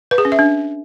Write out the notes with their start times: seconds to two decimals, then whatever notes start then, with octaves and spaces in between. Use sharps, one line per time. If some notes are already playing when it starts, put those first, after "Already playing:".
0.11 B4
0.18 G#4
0.25 C#4
0.32 E5
0.39 D4